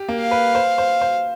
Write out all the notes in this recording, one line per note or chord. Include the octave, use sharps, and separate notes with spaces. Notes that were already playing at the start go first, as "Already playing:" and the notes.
Already playing: G4
A#3
F5
B4
C5
C5
C5